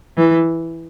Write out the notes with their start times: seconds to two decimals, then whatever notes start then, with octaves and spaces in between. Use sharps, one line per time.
0.17 E3